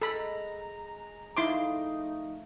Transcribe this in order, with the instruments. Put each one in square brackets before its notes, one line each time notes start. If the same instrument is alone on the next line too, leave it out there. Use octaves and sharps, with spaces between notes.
[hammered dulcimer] G#3 [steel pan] A4 B5 [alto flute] A#5
[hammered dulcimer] F3 A3 [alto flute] D#4 [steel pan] E4 C6 D6